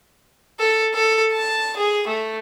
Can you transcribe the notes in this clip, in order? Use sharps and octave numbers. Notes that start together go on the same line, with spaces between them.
A4
A4
A5
G#4
A3